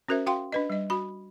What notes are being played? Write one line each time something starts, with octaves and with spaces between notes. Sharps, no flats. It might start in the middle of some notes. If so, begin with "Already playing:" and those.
C#4 F#4 A#4 C5 E5
F#4 F5 G5 C6
D4 B4 D#5
G3 D#5
F#4 B5